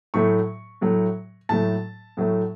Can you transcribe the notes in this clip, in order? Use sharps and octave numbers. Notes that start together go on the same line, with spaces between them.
A2 F#3 A3 C#6
A2 F#3 A3
A2 F#3 A3 A5
A2 F#3 A3